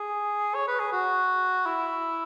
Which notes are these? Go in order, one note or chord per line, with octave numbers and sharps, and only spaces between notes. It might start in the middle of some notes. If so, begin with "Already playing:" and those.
Already playing: G#4
C#5
B4
G#4
F#4
E4